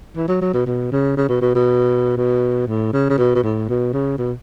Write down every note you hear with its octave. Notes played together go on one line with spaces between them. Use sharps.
E3
F#3
F#3
B2
B2
C#3
C#3
B2
B2
B2
B2
A2
C#3
C#3
B2
B2
A2
B2
C#3
B2